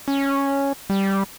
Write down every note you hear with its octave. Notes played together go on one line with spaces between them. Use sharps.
C#4
G3